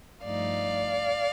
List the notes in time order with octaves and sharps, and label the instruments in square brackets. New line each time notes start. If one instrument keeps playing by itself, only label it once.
[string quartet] G2 F3 A3 D#4 D5 F5